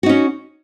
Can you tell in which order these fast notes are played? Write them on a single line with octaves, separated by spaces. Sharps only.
F#4 D#4 C#4